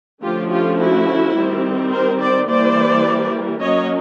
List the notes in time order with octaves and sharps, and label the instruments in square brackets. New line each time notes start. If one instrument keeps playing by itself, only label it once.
[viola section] D3 F3 A3 C#4 F4 G4
F4 G4
E4 F#4
D#3 G3 C4
A#4 C5
C5 D5
E3 G3 A#3 C5 D5
F#3 A#3 C#4 C#5 D#5